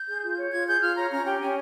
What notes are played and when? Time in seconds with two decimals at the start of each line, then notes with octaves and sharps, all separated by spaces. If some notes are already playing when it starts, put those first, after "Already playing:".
Already playing: G6
0.09 G#4
0.23 F4
0.38 C#5
0.53 F4 G#6
0.67 G#4 G6
0.82 F4 F6
0.96 C#5 A#5
1.11 C#4 A#5
1.26 G4 G5
1.40 C#4 G#5